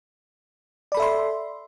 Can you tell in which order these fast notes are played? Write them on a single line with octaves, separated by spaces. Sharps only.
D5 B5 A4 E5 C6